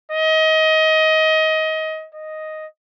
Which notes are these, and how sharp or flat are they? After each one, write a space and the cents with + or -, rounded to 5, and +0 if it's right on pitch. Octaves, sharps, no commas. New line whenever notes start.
D#5 +25
D#5 +0